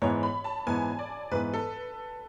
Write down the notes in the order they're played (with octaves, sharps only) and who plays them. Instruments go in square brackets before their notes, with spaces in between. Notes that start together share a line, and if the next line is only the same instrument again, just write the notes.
[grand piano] G#2 E3 B3 [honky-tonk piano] C#5
[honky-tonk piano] B5
A5
[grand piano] G#2 E3 B3 [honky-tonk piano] G#5
[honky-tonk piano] D5
[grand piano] G#2 E3 B3 [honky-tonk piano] B4
[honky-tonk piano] A4